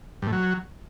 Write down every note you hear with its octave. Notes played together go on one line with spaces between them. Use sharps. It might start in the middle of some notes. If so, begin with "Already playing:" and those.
G2
A2
F#3